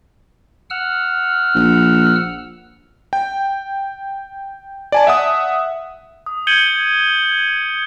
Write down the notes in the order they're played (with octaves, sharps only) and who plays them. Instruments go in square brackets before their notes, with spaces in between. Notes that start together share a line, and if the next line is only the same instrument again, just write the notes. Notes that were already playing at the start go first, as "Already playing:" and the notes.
[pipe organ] F#5 E6 F6
[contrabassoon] A#1
[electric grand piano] G5
D5 G#5 A5
E5 F#5 D#6
[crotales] D#6
G6 G#6 C#7 D#7 F#7 G7